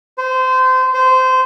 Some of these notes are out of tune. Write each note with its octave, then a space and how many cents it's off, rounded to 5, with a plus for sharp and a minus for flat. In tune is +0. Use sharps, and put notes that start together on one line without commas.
C5 -25
C5 -20